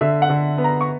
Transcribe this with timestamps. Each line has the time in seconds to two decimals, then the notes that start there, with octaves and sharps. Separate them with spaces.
0.01 D3 E5
0.22 F#5
0.30 D3
0.58 B3
0.64 A#5
0.81 C#6